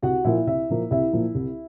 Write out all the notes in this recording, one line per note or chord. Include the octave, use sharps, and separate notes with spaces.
C2 F#4 F#5
A#2 F3 A#3 E4 E5
C2 E4 E5
A#2 F3 A#3
C2 E4 E5
A#2 F3 A#3
C2